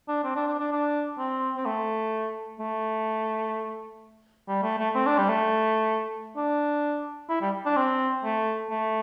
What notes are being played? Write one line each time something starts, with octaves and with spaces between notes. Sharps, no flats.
D4
C4
D4
D4
D4
D4
C4
C4
A3
A3
G3
A3
A3
C4
D4
G3
A3
D4
E4
G3
D4
C4
A3
A3